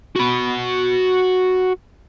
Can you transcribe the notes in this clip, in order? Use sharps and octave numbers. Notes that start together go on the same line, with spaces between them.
F#4 B5